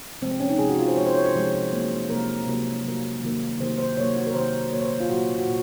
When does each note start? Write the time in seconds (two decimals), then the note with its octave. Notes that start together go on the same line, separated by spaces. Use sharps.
0.21 C3 F3 G#3 C4
0.31 C4
0.40 C#4
0.50 D#4
0.59 C3 F3 G#3 G#4
0.69 F#4
0.79 F4
0.88 C5
0.97 C3 F3 G#3 C#5
1.06 C5
1.15 C#5
1.25 C5
1.35 C3 F3 G#3
1.72 C3 F#3 A#3
2.10 C3 F#3 A#3 A#4
2.47 C3 F#3 A#3
2.84 C3 F#3 A#3
3.23 C3 D#3 F#3 A#3
3.59 C3 D#3 F#3 A#3 C5
3.78 C5
3.97 C3 D#3 F#3 A#3 C#5
4.16 F#4
4.27 A#4
4.35 C3 D#3 F#3 A#3 C5
4.73 A#2 F#3 A#3 C#5
4.82 C5
5.00 F4
5.10 A#2 F#3 A#3 F#4
5.39 F#4
5.47 A#2